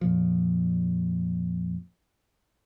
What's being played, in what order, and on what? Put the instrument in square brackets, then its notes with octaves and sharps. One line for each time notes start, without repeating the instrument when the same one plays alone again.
[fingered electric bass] F2 A#2 F3